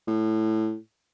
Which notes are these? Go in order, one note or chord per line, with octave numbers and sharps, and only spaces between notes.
A2